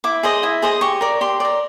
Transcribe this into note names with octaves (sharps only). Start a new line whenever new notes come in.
E4 D6
G#4 C5 D#5
E4
G#4 C5 D#5
G4 C#6
A#4 D5
G4 C6
A#4 D5